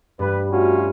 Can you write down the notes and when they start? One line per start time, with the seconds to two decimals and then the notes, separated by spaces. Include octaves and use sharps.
0.19 G2 G3 B4
0.51 A2 C#4 F4 F#4